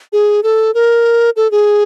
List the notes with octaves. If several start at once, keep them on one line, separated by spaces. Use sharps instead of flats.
G#4
A4
A#4
A4
G#4